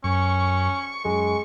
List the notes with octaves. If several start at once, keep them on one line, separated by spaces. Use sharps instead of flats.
F#2 C#4 C#6
F#2 G#3